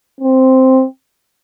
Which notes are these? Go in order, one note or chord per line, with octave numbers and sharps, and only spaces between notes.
C4